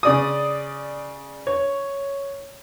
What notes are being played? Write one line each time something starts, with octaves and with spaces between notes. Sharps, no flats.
C#3 D5 D#6
C#5